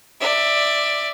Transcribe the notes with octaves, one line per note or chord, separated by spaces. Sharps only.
D5 E5